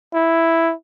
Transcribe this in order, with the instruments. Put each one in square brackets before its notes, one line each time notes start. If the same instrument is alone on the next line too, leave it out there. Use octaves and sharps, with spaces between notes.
[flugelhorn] E4